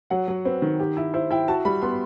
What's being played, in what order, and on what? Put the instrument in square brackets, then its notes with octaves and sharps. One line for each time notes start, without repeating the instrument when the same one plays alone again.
[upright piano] F#3 [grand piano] F#5
[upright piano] F#3
[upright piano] C4 [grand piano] B4
[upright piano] D#3
G4
E4
[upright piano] E4 [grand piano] C5
[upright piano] E4 [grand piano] G5
[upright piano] F#4 [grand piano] A5
[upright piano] G3 [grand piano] B5
[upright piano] B3 [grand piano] C6